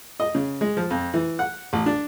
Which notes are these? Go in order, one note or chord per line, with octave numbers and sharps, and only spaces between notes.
D#5
C#3
G#3
F3
F2
E3
F#5
A1
D4